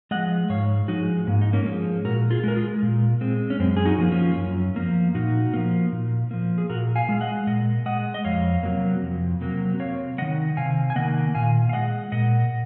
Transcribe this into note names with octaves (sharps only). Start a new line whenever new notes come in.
F3 G#3 D#5 F#5
G#2 C#5 F5
F3 G#3 D#4 F#4
G#2 A#3
D#4
A#3 C#4
F3 G#3
A#2 F#4 A#4
F4 G#4
G#3 A#4
F4 G#4
A#2
G#3 C4
C#4
F#2 C4
G#4
D#4 F#4
F3 A#3
C#4 F4
F#2
F3 A#3
A#2 D#4 F#4
F3 A#3
A#2
F3 A#3
G#4
A#2 F#4 A#4
F5 G#5
G#3 F5
D#5 F#5
A#2 D#5 F#5
G#3 D#5 F#5
D#5
F2 C#5 F5
C3 F#3 A#3
F2
C3 F#3 A#3
C3 C#5 F5
D#3 A#3 D#5 F#5
C3 F5 G#5
G#5
D#3 A#3 D#5 F#5
A#2 F5 G#5
F5
G#3 D#5 F#5
A#2 D#5 F#5